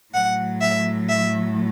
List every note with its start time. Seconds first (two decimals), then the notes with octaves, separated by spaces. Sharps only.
0.14 A2 F#3 A3 F#5
0.61 E5
1.09 E5